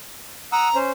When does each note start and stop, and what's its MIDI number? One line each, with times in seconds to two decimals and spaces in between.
0.52 0.68 78
0.52 0.77 82
0.52 0.68 87
0.52 0.68 88
0.75 0.91 61
0.75 0.91 72